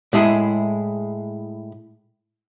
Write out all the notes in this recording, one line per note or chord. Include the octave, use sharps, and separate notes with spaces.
A2 G#3 E4 G#4